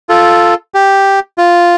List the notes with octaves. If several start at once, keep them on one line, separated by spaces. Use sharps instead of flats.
F4 A4
G4
F4